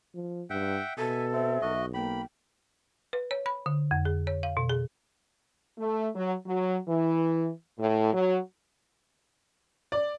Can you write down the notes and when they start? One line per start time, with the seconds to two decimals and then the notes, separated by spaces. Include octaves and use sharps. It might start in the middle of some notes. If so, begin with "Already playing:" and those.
0.15 F3
0.50 G2 E5 F#5 G5
0.98 B2 A4 E5 G#5
1.32 C4 E5
1.62 B1 F#4 D#5
1.94 A#3 G5 B5
3.13 B4
3.31 C#5
3.46 B5
3.66 D3
3.91 F2
4.05 G#4
4.27 C#5
4.43 F5
4.57 B2
4.70 G#4
5.78 A3
6.15 F#3
6.46 F#3
6.87 E3
7.79 A2
8.13 F#3
9.92 D5